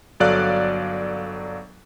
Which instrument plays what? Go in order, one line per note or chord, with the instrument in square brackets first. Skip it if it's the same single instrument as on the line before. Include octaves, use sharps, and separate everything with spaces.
[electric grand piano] G1 F#3 A4 D5 F5 F#6